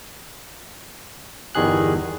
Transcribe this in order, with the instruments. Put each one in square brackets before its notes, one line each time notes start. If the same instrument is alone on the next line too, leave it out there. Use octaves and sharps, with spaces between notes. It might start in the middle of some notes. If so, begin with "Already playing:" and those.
[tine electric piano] G1 E2 D#3 G3 G#4 F#6